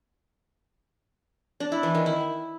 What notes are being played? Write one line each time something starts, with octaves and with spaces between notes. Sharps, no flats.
D4
E4
E3
D#3
E4